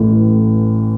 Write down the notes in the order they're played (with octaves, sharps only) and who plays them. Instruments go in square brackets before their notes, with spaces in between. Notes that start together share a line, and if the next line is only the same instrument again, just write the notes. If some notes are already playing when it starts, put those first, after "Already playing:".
Already playing: [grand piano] A1 A2 E3